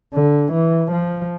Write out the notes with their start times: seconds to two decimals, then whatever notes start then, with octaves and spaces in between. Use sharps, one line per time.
0.14 D3
0.53 E3
0.92 F3